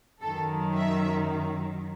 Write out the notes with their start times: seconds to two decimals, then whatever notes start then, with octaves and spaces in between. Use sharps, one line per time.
0.21 F#2 D#3 F#3 A4
0.77 E5